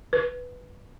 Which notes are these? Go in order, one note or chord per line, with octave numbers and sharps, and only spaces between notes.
B4